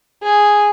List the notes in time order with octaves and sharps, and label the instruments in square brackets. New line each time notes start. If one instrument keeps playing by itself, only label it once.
[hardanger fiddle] G#4